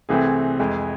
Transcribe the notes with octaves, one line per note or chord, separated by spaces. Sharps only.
C2 C3 E3 A3 C4 G#4
F2 E3 G#3